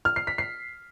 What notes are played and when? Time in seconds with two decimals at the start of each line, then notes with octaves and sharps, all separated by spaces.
0.05 F6
0.16 C7
0.27 B6
0.38 C7